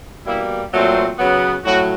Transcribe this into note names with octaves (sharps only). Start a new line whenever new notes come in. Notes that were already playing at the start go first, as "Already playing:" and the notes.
B2 G3 A#3 E4
A#2 F#3 A3 C4
C#3 F#3 B3
A2 F#3 F#4